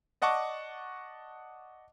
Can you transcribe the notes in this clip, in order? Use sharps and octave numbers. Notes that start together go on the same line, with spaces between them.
D5 D#5 F#5 A5 C#6 D6